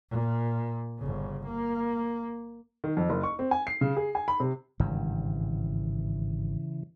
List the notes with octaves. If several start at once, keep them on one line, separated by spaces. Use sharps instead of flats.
A#2
G1 C#3
A#3
D#3
F2
F#1
C#6
C4
G#5
C7
C#3
G#4
G#5
B5
C3
G#1 G2 C#3 E3